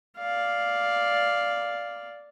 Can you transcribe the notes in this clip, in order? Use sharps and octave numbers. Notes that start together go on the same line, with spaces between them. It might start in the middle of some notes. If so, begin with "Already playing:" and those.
D5 F5